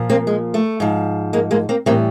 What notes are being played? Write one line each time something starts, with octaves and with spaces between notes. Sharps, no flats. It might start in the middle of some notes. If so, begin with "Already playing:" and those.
Already playing: A#2 F3
A#3 C4
G#3
A3
G#2 F3
G#3 A#3
G#3 A#3
A#3 C4
A2 E3 G3 A#3 C4